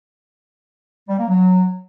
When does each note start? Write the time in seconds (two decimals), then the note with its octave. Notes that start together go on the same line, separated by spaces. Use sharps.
1.08 G3
1.18 A#3
1.28 F#3